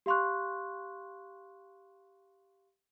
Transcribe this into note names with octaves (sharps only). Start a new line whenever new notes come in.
G4 F5 C6 C#6 F#6